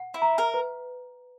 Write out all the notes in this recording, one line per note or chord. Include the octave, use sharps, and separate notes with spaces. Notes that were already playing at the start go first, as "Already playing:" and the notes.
Already playing: F#5
E4
A#5
A#4
B4